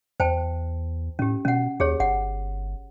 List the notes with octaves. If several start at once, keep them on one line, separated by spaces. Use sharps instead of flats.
E2 C5 G5 A5
A2 C#4 G4
B2 C#4 F#5
D#2 G4 G#4 C#5
G1 F#5